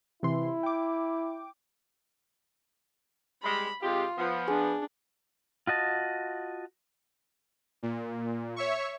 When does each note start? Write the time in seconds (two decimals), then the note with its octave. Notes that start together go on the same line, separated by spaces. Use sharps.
0.23 C3 E3 E4 C6
0.63 G5 D6
3.43 G3 G#3 B5
3.82 C3 G#3 F4 G4
4.17 F3 B3
4.47 D4 G#4
5.67 F4 F#4 D#5 A5
7.83 A#2
8.56 C#5 E5 C#6